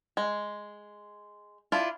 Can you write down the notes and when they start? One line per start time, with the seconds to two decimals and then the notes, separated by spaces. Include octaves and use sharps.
0.17 G#3
1.72 D4 E4 F4